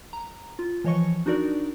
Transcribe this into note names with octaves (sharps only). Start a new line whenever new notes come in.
A#5
F4
E3 F3 C#5 D#5 C#6 C#7
D4 D#4 F#4 A#4 D5